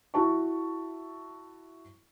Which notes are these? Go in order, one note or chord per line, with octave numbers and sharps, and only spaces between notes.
E4 F#4 A5 C#6